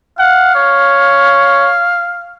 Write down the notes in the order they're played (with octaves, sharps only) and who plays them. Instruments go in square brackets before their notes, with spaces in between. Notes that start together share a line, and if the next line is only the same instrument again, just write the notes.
[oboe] F5 [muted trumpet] F#5
[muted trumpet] C#5